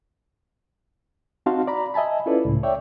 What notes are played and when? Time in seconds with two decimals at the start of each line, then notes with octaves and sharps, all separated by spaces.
1.46 C4 D#4 F#4 F5 A5 C6
1.67 D5 A#5 B5
1.94 D#5 E5 G#5 A5 B5
2.26 C#4 E4 F4 A4 B4 D5
2.45 C#2 A2
2.63 C#5 D5 E5 G5